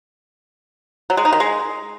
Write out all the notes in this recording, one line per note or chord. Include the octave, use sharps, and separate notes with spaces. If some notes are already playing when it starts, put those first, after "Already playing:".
F#3
G#3
D#4
D#3
G#3